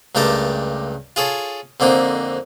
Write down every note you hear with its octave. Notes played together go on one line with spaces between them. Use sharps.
C#2 G2 A3 G4 A#4 A5
F4 G#4 A4 C#5
F2 D3 A#3 C4 D#4